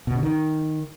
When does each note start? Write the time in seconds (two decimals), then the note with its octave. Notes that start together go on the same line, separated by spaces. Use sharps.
0.07 B2
0.15 C#3
0.23 D#3